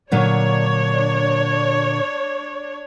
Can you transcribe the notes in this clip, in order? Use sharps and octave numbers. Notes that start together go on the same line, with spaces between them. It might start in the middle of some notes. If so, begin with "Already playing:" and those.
A#2 D3 F#3 D4 C#5 D5